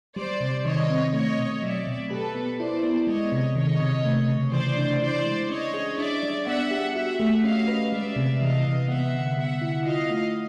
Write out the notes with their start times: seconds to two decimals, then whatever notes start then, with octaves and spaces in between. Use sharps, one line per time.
0.16 G3 C5 D5
0.41 C3
0.65 D#3 C#5 D#5
0.90 C4
1.13 A3 C#5 D#5
1.37 B2
1.62 F#3 D5 E5
1.87 B2
2.11 G4 A4 B4
2.35 B3
2.59 E4 C5 D5
2.83 B3
3.07 G#3 C#5 D#5
3.32 C3
3.55 D#3 C#5 D#5
3.80 C3
4.05 A3
4.28 C#3
4.52 E3 C5 D5
4.77 D4
5.01 E4 C5 D5
5.26 G#3
5.50 C#4 C#5 D#5
5.74 G#4
5.98 D4 D5 E5
6.23 G3
6.47 B3 E5 F#5
6.71 G4
6.95 F#4 E5 F#5
7.20 A3
7.43 C#4 D#5 F5
7.68 B4
7.92 G#3 D5 E5
8.16 C3
8.40 E3 D#5 F5
8.65 C3
8.88 B3 E5 F#5
9.13 D3
9.37 G3 E5 F#5
9.62 E4
9.85 F4 D#5 F5
10.09 A3